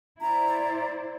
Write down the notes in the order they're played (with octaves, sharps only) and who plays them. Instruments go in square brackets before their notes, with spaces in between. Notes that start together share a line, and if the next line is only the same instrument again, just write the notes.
[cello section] E4 C5 D5 [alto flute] A#5